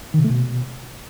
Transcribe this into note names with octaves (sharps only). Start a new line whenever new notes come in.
D#3
C3
A3
B2